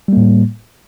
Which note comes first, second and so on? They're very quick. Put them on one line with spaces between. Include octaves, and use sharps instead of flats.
G3 A#3 A2